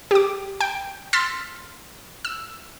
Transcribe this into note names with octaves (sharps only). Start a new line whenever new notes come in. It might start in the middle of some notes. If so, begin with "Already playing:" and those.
G4 D6
G5
C6 E6 F6 A6 B6
E6